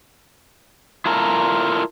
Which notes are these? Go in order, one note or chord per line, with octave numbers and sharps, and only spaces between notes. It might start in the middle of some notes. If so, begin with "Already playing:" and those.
E4 F4 A4 A#4